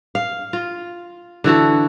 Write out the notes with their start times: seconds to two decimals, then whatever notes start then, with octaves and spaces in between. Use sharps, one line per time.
0.15 F5
0.53 F4
1.44 D3 E3 F#4 A4